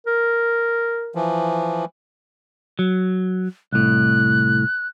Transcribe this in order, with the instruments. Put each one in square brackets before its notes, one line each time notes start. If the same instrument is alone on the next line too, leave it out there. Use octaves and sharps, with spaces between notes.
[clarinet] A#4
[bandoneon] E3 F3
[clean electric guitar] F#3
[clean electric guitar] C2 A2 [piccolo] F#6